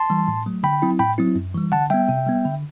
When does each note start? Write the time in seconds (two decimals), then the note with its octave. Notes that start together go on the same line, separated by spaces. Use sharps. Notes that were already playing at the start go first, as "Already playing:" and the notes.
Already playing: A5 C6
0.10 E3 G3
0.28 A2
0.46 F#3 A3
0.63 D3 G5 B5
0.82 F#3 C4 E4
0.99 A2 G5 B5
1.18 F#3 C4 E4
1.36 F#2
1.54 E3 G3
1.72 D3 F#5 A5
1.90 G3 B3 E5 G5
2.09 C3
2.26 G3 B3
2.45 D3